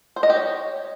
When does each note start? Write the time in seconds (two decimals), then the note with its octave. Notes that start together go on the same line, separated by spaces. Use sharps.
0.16 C5
0.23 D#5
0.30 G4
0.36 C#5